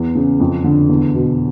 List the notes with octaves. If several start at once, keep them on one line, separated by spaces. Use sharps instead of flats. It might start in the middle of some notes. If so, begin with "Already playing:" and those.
Already playing: E2
C#3
F2
D3
E2
B2